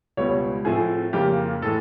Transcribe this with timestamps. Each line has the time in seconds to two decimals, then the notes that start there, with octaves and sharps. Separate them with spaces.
0.17 C#2 B2 G3 B3 C#5
0.65 A2 F3 A3 C4 G#4
1.13 F2 C#3 F3 A#3 G4
1.62 A2 E3 G#3 A4